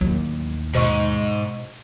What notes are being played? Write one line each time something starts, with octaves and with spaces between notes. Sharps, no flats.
A1 D#2 F#3
G#2 B2 C5 D#5 C#6